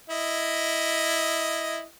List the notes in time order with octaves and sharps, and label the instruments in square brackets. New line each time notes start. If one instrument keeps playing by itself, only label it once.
[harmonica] E4 D#5